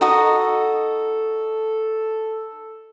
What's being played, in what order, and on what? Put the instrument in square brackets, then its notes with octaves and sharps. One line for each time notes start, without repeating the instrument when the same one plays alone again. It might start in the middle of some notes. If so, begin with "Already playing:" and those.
[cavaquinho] D#4 F#4 D#5 [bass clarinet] A4